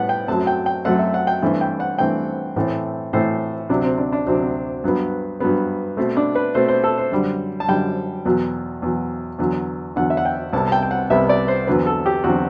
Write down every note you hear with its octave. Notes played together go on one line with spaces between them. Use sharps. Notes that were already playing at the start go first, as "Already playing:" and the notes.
Already playing: A2 G3 B3 F#5
G5
F#2 F#3 A3 C4 A5
G5
G5
F#2 F#3 A3 C4 F#5
E5
F#5
G5
G2 E3 A3 C4
G5
F#5
G2 E3 A3 C4 G5
A2 E3 A3 C4
A2 E3 A3 C4 C5
D2 C3 F#3 D4
C4
D4
D4
D2 C3 F#3 C4
C4
G2 F#3 B3
G2 F#3 B3
B2 A3 C4
D4
B4
B2 A3 C4 C5
C5
A4
C5
F#2 D3 G3
A5
F#2 D3 G3 G5
E2 B2 F#3
E2 B2 F#3
E2 D3 F#3
E2 D3 F#3 F#5
E5
F#5
G5
C2 C3 G3 B3 A5
A5
G5
G5
F#5
C2 C3 G3 B3 E5
D5
C5
E2 D3 F#3 C4 B4
A4
G4
E2 D3 F#3 C4 F#4